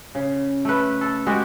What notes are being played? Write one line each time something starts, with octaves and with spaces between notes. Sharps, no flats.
C#3
A3 B4
A4
G#3 F#4 G4